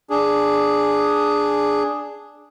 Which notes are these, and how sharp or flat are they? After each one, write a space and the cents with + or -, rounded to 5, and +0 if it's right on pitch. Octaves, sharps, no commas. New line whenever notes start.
D4 +0 G#4 +0